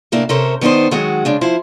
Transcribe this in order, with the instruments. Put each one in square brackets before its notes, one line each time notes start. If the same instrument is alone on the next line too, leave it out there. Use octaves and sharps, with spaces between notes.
[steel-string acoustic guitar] A2 C3 A#3 D4 E4
C3 C#4 A4 A#4 C5
D#3 B3 D4 D#4 C5
D#3 F#3 G#3 F#4 F#5
C#3 G#3 D4
F3 E4 C5